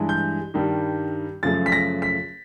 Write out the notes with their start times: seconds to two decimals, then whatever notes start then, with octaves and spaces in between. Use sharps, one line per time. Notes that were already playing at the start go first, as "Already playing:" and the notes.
Already playing: G2 E3 G#3
0.09 G6
0.54 G2 D#3 G3
1.43 F#2 C#3 F3 A3 A6
1.66 B6
1.72 A#6
2.02 B6